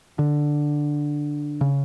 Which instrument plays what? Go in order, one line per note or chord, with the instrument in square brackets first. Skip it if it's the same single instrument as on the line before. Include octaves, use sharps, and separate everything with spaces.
[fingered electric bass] D3
C#3